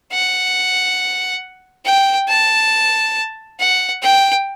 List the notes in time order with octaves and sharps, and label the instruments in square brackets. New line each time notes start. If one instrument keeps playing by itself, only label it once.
[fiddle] F#5
G5
A5
F#5
G5